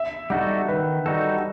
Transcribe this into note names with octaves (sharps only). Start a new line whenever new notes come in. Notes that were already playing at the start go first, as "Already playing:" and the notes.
Already playing: E5
G3 D#4 F#4 A4 F#5
D#3 B4
G3 D#4 F#4 A4